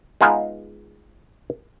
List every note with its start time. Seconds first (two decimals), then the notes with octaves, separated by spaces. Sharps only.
0.21 G#3 B3 D#4 F4 G#4